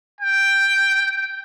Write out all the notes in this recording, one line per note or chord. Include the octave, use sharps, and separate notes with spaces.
G5